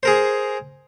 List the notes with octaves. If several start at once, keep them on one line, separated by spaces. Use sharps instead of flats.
G#4 A#4 C5